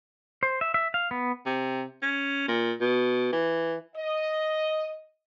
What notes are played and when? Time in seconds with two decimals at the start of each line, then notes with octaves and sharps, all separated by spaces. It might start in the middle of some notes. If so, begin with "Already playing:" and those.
0.43 C5
0.61 E5
0.74 E5
0.94 F5
1.11 B3
1.46 C3
2.02 C#4
2.48 A#2
2.81 B2
3.32 E3
3.96 D#5